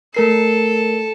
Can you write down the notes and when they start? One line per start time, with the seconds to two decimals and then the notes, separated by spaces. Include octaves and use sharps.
0.15 A3 A4 A#4 C7